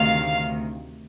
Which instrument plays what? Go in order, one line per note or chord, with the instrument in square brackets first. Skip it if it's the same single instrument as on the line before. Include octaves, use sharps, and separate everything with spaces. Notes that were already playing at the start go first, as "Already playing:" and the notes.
Already playing: [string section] D2 C3 D#3 F5